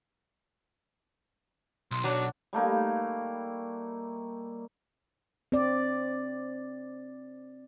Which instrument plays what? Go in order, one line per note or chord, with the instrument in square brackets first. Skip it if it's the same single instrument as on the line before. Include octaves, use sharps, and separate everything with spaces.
[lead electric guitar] B1 [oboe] C6
[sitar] F#3 [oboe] D4
[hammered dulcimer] G3 A3 A#3 D#4
[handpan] C4 D5